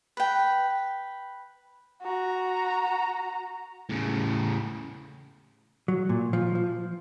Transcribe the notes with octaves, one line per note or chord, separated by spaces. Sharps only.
B4 G5
F#4 A#5
A2 C#3
F#3
A#2
F3
F3